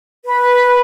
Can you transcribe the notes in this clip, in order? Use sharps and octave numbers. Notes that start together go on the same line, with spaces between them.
B4